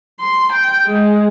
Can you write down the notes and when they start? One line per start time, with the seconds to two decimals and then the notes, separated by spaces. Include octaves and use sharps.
0.20 C6
0.53 G5
0.86 G#3